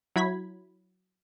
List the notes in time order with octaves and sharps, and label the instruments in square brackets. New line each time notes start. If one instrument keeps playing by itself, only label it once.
[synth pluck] F#3 E4 B5 G#6 B6